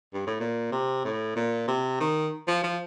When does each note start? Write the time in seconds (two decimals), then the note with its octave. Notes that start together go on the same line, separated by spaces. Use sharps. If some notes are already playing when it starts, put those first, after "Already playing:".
0.14 G2
0.27 A2
0.40 A#2
0.72 C3
1.05 A2
1.36 A#2
1.68 C3
2.00 D#3
2.47 F3
2.63 F3